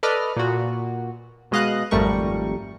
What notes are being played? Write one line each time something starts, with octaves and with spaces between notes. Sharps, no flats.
A4 B4 D5 D#5 F6
A#2 F#4
B2 G#3 D#5 F5 F#6
G#1 F2 G3 A3 A#4 C#6